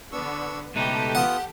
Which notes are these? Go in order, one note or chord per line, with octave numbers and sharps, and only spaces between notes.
D3 B3 D4 C#6 E6
C#2 B2 A3 D#4 G4 A4 B4
B3 F4 F#5 D#6